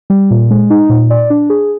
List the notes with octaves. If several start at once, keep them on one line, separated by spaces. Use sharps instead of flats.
G3
A#2
G#3
D#4
A#2
D5
D4
G#4